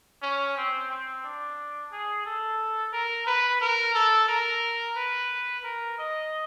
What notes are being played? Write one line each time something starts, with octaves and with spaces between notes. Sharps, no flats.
C#4
C4
C4
D4
G#4
A4
A#4
B4
A#4
A4
A#4
B4
A#4
D#5